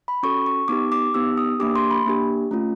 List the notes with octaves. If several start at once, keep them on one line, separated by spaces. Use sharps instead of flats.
B5
C#4 F#4 A4 C#6
C#6
B3 D#4 G4 D6
D6
B3 D#4 G4 E6
D#6
A#3 D4 G4 D6
C6
B5
A#3 D4 G4
A3 C#4 F4